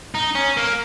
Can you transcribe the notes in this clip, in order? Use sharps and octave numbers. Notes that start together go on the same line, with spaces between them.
D#4
C#4
A#3